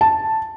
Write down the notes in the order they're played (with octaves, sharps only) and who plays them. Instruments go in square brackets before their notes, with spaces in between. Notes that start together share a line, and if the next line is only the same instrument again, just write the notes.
[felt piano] A5